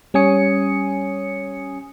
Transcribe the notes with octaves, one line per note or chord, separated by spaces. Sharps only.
G3 C#4 C#5 G#5 D#6 C#7